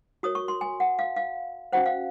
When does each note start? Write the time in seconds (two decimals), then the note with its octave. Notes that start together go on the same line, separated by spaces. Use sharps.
0.23 F#4 A#4 C#5 D#6
0.35 C#6
0.48 C6
0.61 G#5
0.80 F#5
0.99 F5
1.16 F5
1.72 C#4 F#4 C5 F#5
1.86 F5